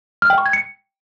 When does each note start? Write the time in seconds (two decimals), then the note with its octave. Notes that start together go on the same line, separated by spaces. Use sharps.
0.22 F6
0.30 G5
0.38 C#6
0.46 G#6
0.53 C#7